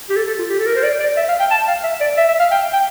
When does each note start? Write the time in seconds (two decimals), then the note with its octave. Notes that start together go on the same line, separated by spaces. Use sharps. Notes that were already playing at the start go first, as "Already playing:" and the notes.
0.10 G4
0.16 A4
0.27 A4
0.39 F4
0.50 G4
0.59 A4
0.66 A#4
0.75 C5
0.83 D5
1.00 D5
1.16 E5
1.28 F5
1.40 G5
1.51 A5
1.68 F5
1.83 E5
2.01 D5
2.17 E5
2.28 E5
2.39 F5
2.51 G5
2.73 G5